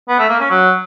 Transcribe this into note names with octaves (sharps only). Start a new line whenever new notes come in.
B3
A3
A#3
C#4
F#3